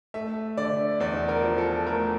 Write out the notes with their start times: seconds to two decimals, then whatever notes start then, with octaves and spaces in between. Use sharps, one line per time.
0.14 A3 E5
0.57 D3 D5
1.00 E2 D5
1.29 A#4
1.44 F3
1.58 A4
1.87 A3 A#4